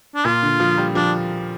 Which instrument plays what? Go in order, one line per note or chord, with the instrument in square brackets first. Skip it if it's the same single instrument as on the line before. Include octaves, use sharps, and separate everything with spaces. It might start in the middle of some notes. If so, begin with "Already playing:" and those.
[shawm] D4
[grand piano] A#2 [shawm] F4
[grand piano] D3
F3
G3
[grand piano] F3 [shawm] D4